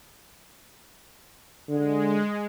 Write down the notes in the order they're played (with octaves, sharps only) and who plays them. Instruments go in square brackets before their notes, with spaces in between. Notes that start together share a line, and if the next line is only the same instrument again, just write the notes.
[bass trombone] D3 [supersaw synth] G#3